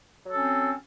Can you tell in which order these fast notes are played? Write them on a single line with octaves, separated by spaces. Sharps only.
F#3 A4 C#4 C4